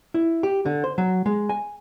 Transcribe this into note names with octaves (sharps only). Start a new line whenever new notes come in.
E4
G4
D3
C5
F#3
G#3
G#5